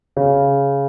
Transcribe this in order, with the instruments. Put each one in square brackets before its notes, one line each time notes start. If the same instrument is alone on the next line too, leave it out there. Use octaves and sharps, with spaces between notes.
[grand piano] C#3